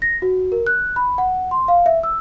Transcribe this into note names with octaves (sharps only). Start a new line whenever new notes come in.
A#6
F#4
A#4
F#6
B5
F#5
C6
F5
E5
E6